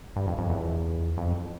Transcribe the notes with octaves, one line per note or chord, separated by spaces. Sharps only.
G2
F2
F2
E2
F2